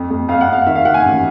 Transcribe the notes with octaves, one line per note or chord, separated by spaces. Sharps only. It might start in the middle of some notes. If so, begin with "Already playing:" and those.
Already playing: F2
F2
F2 F5
F#5
F2 F5
D#3 E5
F5
D#3 F#5
G#5
A1